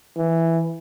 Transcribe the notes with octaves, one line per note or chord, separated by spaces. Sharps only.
E3